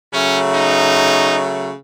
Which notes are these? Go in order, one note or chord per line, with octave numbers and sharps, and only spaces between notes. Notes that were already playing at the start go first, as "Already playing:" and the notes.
C#3 F#3 A3 C#4
D#4